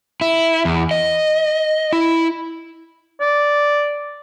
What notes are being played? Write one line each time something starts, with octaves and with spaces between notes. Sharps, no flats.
E4
E2
D#5
E4
D5